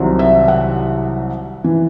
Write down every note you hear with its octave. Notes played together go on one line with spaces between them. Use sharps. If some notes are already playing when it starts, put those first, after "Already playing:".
Already playing: C2 C3 D#3 F#3
E5
F#5
E3